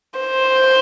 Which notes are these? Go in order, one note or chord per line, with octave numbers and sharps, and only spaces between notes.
C5